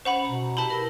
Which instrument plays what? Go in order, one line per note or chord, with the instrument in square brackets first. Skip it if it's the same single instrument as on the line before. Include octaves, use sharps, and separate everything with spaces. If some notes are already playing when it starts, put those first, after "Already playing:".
[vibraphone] C#4 [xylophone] C5 F#5 B5
[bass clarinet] B2 [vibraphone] A#5
[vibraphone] E4 G4 B4 [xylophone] A5 B5
[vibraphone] A#4